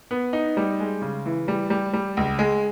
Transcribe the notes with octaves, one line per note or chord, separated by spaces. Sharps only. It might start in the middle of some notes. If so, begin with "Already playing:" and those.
B3
D#4
G3
G#3
C#3
E3
G3
G3
G3
C#2
G#3